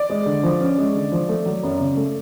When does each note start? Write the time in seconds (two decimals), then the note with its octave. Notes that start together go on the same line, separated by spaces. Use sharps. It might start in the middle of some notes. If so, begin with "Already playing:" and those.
Already playing: D5
0.10 G#3
0.26 D3
0.43 F3
0.61 C#4
0.78 G#3
0.95 D3
1.12 F3
1.29 A3
1.46 F#3
1.63 F#2
1.80 C#3
1.97 A3